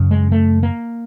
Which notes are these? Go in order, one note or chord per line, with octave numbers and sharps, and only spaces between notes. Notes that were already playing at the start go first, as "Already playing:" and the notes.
Already playing: F#2 C#3
G#3
A3
A#3